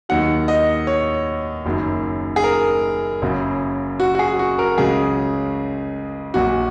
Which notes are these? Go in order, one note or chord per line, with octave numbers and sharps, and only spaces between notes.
D#2 D#3 F#3 F#5
D#5
C#5
F#1 F#2 D#3 F#3
G#4
A#4
F#1 F#2 C#3 F#3
F#4
F#4
G#4
F#4
A#4
C#2 C#3 F#3 G#4
A#1 A#2 F#3 F#4